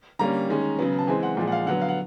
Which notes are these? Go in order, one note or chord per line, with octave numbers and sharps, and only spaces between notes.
D3 G3 A#3 C#4 A#5
D#3 G#3 C#4
C#3 F#3 B3
A5
E3 G#3 C4 G#5
F#5
A#2 F3 G#3
F#5
F5
D3 F#3 B3 F#5
F5
F#5